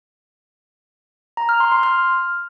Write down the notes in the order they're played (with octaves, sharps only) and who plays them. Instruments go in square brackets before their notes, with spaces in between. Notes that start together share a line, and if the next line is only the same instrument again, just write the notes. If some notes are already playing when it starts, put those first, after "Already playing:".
[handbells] A#5
F6
C6
C6
F6